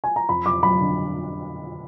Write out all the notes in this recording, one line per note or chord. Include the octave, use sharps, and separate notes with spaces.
G#5
A#5
F2 B5
F2 D6
F#3 B5
D3